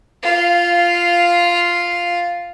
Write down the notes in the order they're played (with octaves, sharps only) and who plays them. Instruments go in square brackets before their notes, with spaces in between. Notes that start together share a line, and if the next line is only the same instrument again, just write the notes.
[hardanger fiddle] F4 F5